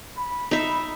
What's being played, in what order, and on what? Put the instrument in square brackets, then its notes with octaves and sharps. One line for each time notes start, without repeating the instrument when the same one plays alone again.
[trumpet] B5
[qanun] D#4 E5